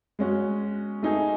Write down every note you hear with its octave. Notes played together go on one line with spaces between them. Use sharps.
G#3 C#4 F#4
A3 D#4 G#4